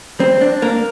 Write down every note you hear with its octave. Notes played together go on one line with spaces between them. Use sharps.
C4
D4
A#3